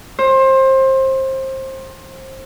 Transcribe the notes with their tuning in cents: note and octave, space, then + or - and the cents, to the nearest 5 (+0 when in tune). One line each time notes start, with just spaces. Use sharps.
C5 +25